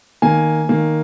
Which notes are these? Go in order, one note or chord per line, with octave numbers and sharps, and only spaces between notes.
D#3 A#3 G#5
D#3 A#3